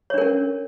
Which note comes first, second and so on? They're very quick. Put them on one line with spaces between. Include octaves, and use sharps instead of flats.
C#5 D4 A#4 C#4